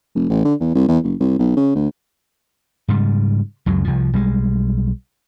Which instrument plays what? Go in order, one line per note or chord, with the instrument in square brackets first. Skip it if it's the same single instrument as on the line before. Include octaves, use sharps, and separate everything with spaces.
[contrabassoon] F1
A1
D3
E2
C2
E2
F#1
C2
B1
C#3
D2
[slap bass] G#2 C#3 G3
C#2 F#2 C#3 F#3
C2 F3
B1 G3 G#3